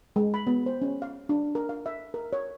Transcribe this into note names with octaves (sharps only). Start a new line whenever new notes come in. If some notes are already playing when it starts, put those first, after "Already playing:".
G#3
B5
B3
C5
C#4
F5
D4
A#4
F5
E5
A#4
C#5